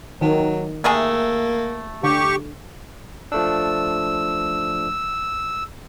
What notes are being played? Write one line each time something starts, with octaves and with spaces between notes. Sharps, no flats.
D#3 F#3
C3 A3 A#3 G#4
D3 G4 C#6
F3 A3 D4 E6